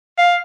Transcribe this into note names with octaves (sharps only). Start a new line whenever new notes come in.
F5